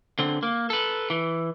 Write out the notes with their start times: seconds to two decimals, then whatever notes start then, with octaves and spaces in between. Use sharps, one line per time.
0.19 D3 C4
0.43 A#3
0.70 A4 B4
1.10 E3